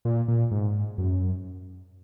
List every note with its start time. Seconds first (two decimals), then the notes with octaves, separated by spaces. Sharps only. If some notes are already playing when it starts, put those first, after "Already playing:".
0.05 A#2
0.28 A#2
0.51 G#2
0.98 F#2